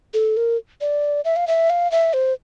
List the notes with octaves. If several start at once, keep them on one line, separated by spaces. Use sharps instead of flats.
A4
A#4
D5
E5
F5
E5
F5
E5
C5